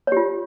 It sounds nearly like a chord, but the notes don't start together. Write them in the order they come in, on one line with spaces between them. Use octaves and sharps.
C#5 G4 F4